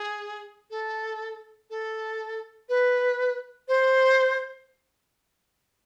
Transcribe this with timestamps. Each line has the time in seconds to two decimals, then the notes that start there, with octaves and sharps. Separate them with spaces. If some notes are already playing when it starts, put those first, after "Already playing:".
Already playing: G#4
0.70 A4
1.69 A4
2.68 B4
3.68 C5